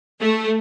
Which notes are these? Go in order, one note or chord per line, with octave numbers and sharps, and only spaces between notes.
A3